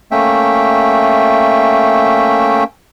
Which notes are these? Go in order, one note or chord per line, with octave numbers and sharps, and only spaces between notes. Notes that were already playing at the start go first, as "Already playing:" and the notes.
A3 A#3 C#4 E5 G5